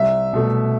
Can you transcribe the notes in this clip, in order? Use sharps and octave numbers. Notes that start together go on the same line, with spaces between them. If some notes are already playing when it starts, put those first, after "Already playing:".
Already playing: C2 E5
B2 A3